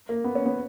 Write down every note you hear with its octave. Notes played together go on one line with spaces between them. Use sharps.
A#3
B3
C#4
B3